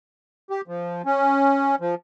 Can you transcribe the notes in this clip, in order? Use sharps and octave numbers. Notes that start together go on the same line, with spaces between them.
G4
F3
C#4
F3